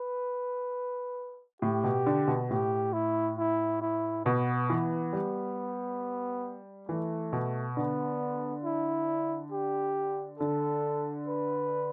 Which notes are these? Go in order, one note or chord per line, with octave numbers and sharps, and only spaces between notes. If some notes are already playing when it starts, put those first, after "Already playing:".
Already playing: B4
A2 G4
B2
D3
B2
A2 G4
E4
E4
E4
B2 B3
E3
G3
E3 A3
B2
D3 B3
E4
G4
D3 A4
B4